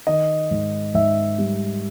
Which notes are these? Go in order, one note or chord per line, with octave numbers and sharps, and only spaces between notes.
D#3 D#5
G#2
G#2 E5
G3